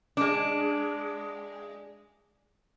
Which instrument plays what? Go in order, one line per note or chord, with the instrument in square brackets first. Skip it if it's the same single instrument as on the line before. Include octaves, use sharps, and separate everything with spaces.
[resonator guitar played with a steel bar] G#3 D4